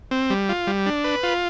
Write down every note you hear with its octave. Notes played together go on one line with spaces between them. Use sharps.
C4
G3
F4
G3
D4
B4
F4